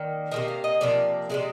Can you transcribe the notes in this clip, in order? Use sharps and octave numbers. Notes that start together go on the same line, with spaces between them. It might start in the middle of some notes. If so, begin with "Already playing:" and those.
Already playing: D#3 A#3 D5
C3 F3 A#3 D#5
F5
D#5
C3 F3 A#3 D5
C3 D#3 G#3 D5